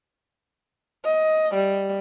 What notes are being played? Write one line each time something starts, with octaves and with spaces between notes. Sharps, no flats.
D#5
G3